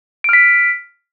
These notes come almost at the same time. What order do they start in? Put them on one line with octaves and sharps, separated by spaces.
D7 F6 B6